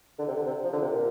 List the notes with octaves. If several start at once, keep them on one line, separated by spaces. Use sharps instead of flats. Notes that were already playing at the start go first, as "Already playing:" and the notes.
D3
C3
D3
C3
F3
D3
C3
A#2